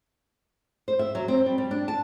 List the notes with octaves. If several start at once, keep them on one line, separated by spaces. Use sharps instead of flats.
C5
E5
F#3
C4
G3
G3
D4
A5